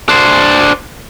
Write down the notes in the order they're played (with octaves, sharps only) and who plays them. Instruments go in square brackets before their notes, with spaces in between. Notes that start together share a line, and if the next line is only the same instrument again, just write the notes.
[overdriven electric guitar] D4 C5